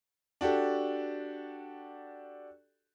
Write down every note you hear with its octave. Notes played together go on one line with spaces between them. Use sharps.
D4 F#4 G4 A4